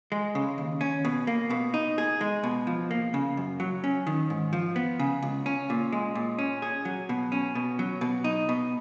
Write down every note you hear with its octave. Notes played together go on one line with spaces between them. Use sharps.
G#3
C#3
D#2
C#4
B2
A#3
B2
D#4
G#4
G#3
B2
F3
A#3
C#3
F#2
F#3
C#4
D#3
G#2
F3
B3
C#3
C#2
C#4
A#2
G#3
A#2
C#4
G#4
F#3
B2
C#4
B2
F#3
B2
D#4
B2